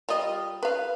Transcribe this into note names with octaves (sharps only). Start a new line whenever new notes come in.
G3 F4 D#5
B4 F5